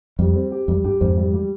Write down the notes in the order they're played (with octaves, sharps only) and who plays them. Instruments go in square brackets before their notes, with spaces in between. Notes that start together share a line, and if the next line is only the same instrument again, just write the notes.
[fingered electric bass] F2 [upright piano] G3
[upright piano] C4
G4
[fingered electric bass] F2 [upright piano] G3
[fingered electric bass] G2 [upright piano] G4
[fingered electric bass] F2 G#2 [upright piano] C4
[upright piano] G3
G3